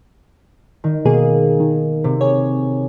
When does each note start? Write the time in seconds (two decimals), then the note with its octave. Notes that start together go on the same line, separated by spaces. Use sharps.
0.84 D#3
1.05 B2 D#3 A#3 G#4
1.60 D#3
2.04 C3
2.21 G#4 C#5